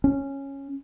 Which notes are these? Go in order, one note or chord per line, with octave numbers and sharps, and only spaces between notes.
C#4